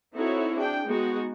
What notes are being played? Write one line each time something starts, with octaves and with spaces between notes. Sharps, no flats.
C4 D#4 E4 F#4 A4 C#5
D4 G#4 G5
G#3 B3 D#4 F#4